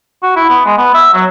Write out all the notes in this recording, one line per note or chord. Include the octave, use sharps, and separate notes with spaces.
F#4
E4
B3
G#3
B3
E5
F#3